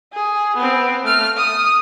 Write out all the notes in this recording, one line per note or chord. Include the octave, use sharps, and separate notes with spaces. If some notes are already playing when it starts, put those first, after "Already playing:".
G#4
B3 C4
A3 F6
D#6